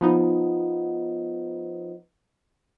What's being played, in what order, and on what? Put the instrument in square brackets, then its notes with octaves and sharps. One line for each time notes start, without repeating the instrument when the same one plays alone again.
[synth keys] F3 B3 D#4